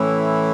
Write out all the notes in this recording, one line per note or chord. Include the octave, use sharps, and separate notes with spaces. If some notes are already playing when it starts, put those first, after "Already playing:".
Already playing: A2 E3 C#4 E4